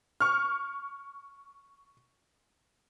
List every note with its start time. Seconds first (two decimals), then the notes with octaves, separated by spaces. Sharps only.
0.20 C#6 F6